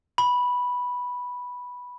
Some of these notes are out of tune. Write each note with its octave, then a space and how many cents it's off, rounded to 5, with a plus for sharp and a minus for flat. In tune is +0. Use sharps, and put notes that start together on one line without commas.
B5 -5